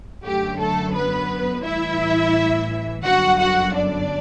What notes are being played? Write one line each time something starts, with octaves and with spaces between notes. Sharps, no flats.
F#2 D3 F#3 A3 G4
A3 A4
B3 B4
A1 A2 E3 G3 E4 E5
G1 F#2 D3 F#4 F#5
F#4 F#5
D4 D5